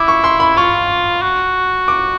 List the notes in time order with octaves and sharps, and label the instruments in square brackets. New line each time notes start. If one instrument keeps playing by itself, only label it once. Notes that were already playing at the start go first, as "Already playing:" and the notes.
Already playing: [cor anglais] E4 [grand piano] D6
[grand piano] C#6
C6
B5
[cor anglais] F4 [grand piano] C#6
[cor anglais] F#4
[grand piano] D6